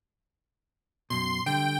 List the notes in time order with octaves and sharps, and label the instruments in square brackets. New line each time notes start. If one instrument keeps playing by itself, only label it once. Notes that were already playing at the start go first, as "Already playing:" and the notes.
[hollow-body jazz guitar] F#2 B2 [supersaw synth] C6
[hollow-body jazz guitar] D3 G3 [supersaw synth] G5